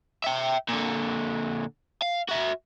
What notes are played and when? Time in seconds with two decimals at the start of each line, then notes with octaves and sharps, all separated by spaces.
0.24 E5 G5
0.69 A#2 D3
2.02 F5
2.29 F#4 E5